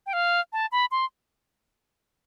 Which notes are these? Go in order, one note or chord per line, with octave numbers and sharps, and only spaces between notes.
G5
F5
A5
B5
C6